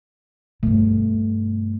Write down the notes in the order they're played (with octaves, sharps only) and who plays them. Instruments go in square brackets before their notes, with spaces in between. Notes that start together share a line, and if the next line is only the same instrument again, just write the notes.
[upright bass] G2 B2 [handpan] A3